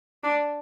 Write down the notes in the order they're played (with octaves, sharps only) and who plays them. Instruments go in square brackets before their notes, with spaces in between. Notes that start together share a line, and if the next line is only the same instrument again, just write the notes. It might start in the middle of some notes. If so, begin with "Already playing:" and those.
[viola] D4